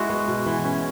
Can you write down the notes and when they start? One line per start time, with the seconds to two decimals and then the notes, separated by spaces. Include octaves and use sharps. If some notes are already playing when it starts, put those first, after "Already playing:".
Already playing: G#3 E4 F#4
0.09 B3
0.28 B2
0.46 E3
0.64 C#4